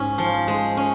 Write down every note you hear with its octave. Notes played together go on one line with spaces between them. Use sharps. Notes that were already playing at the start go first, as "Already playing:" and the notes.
Already playing: G#2 C#4
F3
G#3
C#4